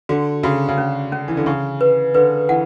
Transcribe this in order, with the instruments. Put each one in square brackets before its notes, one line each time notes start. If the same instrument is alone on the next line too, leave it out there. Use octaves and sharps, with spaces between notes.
[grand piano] D3 [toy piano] F#4
[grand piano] C#3 [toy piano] F#4
[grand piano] C#3
[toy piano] C#4
C#4
[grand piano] E3
D3
[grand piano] C#3 [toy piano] C#6
[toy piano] B4
[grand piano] D3 [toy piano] B4
[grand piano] E3 [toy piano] F#5